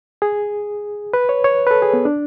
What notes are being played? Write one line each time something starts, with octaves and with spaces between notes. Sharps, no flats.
G#4
B4
C#5
C#5
B4
A4
G#4
B3
D4